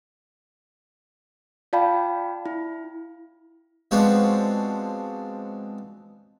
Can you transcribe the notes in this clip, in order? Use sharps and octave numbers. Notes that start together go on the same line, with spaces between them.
F4 D5 F5 G5 A5 B5
E4
F3 G#3 B3 C4 D4 F#4